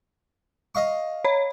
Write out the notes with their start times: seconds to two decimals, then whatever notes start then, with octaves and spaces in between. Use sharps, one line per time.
0.75 D#5 F5 C#6
1.25 C#5 B5